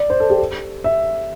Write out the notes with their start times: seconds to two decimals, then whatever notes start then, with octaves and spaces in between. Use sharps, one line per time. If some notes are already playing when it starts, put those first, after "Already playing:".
Already playing: D5
0.10 C5
0.20 A4
0.30 G4
0.84 E5